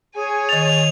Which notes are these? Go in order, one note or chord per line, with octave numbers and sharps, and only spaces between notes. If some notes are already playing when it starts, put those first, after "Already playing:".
G#4 C#5 G#5
D#3 A6 F7